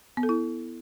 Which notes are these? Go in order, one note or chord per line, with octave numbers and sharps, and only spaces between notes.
B3
A4
E4